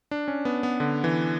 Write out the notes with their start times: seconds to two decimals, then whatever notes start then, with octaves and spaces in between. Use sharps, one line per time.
0.11 D4
0.28 C#4
0.45 B3
0.63 B3
0.80 D3
1.04 E3